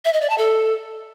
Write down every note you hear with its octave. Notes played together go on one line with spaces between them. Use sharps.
E5
D#5
D5
A5
A4